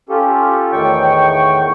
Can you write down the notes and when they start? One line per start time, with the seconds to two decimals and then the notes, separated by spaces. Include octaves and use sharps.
0.09 C#4 F4 G4 A4
0.72 E2 A2 D#3 G5 C#6